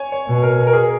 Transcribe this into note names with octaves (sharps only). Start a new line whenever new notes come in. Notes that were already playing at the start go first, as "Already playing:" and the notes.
Already playing: C#5 G#5
C#5
B2
A#4
A#4
G#4